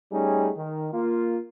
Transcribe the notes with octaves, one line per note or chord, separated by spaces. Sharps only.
G3 A3 C#4 D#4 G#4
D#3
A#3 F4